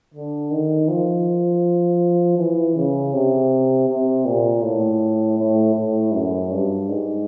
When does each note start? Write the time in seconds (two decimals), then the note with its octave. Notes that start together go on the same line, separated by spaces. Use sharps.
0.14 D3
0.51 D#3
0.88 F3
2.38 E3
2.75 C#3
3.14 C3
3.89 C3
4.25 A#2
4.63 A2
5.38 A2
5.75 A2
6.13 F#2
6.51 G2
6.88 G#2